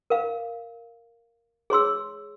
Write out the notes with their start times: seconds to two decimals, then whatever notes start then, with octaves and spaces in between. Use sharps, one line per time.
0.10 A#4 F5
1.70 G#4 C#5 C6 E6